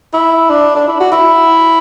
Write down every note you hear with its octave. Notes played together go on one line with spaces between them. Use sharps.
E4
D4
D4
E4
F#4
E4